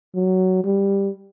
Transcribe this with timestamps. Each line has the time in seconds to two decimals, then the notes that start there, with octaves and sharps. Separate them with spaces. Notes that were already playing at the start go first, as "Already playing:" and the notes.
0.15 F#3
0.64 G3